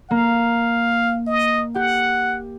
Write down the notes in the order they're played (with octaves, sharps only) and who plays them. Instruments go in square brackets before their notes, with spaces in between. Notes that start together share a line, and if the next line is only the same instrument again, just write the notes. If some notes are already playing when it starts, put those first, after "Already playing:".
[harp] A#3 [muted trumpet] F5
[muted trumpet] D#5
[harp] G4 [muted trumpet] F#5